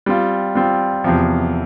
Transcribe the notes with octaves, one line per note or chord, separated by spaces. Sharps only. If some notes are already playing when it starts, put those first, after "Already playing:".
G3 C4 F4
G3 C4 F4
E2 C3 F3